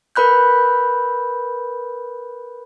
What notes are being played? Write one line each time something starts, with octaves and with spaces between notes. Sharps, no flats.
A#4 B4 B5 F#6 G6